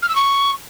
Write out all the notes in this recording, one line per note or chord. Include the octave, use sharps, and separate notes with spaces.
F6
E6
C#6